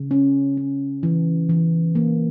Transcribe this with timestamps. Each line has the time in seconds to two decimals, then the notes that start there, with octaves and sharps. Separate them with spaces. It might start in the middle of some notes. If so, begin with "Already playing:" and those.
Already playing: C#3
0.11 C#4
0.57 C#4
1.03 E3
1.49 E3
1.95 A#3